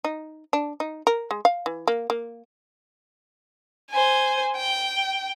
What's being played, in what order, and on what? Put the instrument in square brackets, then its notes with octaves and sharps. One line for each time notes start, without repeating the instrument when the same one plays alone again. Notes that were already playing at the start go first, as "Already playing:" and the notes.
[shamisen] D#4
D4
D#4
A#4
G#3
F5
E3
A#3
A#3
[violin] C5 G#5
G5